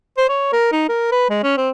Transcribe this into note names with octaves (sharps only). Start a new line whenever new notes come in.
C5
C#5
A#4
D#4
A#4
B4
G#3
C#4
C4